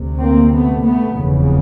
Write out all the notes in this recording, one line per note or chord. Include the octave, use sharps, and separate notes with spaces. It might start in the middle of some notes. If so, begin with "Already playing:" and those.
Already playing: D2 C3
A#3 C4
A3 B3
A3 B3
F1 E2 C#3